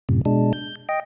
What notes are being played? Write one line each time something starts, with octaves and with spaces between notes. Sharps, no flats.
F#2 A2 C3
B2 G#3 D4
G6
D#5 G5